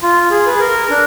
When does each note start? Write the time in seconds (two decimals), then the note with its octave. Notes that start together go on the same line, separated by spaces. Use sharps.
0.03 F4
0.31 G#4
0.46 B4
0.56 G#4
0.60 A#4
0.90 D4